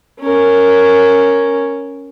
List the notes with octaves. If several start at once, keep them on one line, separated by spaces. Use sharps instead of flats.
C#4 A#4